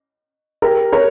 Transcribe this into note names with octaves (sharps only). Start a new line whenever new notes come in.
G4 A#4
A#4 C#5